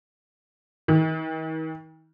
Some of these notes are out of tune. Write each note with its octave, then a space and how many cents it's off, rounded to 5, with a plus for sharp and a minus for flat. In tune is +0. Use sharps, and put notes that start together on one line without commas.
D#3 +45